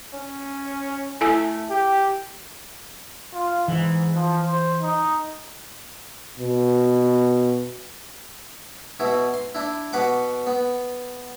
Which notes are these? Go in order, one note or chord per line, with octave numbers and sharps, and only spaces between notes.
C#4
A3 E4 A4 G#5
G4
F4
G#2 E3
F3
C5
D#4
B2
B2 E4
C6
D4 E4
B2 B4 F#5 D6
B3